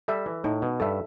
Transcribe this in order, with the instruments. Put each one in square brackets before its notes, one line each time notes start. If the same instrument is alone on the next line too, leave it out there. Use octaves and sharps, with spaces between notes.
[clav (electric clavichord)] G3 [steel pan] A4 E5
[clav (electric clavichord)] E3
[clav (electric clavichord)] A2 [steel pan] D#4
[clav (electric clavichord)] B2
[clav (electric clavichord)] G2 [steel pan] A4 E5